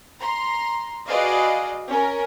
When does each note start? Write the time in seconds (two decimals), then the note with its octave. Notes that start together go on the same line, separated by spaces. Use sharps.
0.20 A#5 C6
1.08 F#4 G#4 B4 D5 D#5 F5
1.90 C#4 A#4